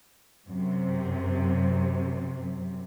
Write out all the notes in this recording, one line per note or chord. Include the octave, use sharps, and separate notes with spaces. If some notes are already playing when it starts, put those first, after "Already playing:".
F#2 C3